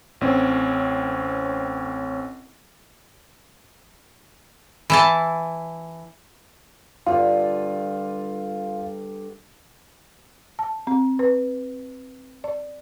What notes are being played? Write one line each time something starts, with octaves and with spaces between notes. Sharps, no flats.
A1 C4 C#4
E3 E4 A5
G2 D3 F4
A5
C4
B4
D5